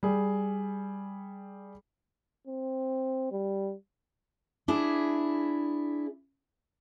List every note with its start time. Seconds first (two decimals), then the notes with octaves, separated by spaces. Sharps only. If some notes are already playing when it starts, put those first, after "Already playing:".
0.03 G3 G#4
2.47 C4
3.31 G3
4.68 D4 E4 G#4